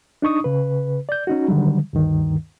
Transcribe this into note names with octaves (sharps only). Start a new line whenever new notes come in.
D4 D#4 C#6 D#6
C#3 B4
D5 G6
C#4 D#4 F#4
D3 D#3 F#3 G3
D2 G2 D#3